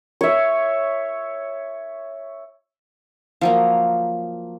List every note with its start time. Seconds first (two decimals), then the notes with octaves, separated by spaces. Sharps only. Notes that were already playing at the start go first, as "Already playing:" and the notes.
0.21 C#5 E5
3.41 F3 F#3 A#3